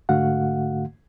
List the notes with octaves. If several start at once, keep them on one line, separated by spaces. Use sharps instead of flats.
G#2 D3 A3 F#4 F5 F#5